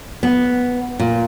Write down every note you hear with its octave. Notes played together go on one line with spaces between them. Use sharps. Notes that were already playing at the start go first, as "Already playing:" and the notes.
B3
A#2